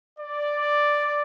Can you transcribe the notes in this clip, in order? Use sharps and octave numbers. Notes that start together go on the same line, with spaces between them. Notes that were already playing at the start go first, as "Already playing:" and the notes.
D5